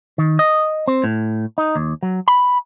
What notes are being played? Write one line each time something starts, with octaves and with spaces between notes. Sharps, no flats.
D#3
D#5
C4
A2
D#4
D#2
F#3
B5